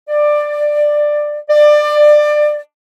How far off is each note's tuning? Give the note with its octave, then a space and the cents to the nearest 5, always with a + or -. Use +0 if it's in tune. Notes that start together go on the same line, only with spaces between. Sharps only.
D5 +15
D5 +25